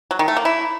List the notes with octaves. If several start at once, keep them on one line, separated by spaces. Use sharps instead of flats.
F#3
D#3
A3
A#3
E4